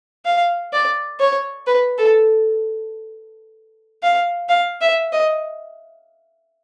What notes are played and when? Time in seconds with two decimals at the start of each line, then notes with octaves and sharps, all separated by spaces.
0.25 F5
0.73 D5
1.19 C#5
1.67 B4
1.98 A4
4.03 F5
4.49 F5
4.81 E5
5.12 D#5